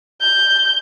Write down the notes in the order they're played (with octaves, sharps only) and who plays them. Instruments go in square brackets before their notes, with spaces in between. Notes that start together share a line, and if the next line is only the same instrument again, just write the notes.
[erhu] G6